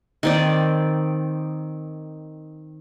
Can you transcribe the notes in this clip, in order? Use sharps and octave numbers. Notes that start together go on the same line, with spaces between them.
D#3 C4 D5